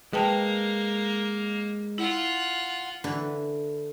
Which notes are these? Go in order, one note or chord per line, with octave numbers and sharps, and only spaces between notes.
G#3 A#3 B4 G5 A5
E4 F4 F#5
D3 E3 B4